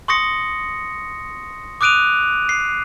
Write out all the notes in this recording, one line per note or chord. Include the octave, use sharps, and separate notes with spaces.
C6 C#6 D#6 A#6 C#7
D6 D#6 F#6 D7 D#7 F7
C7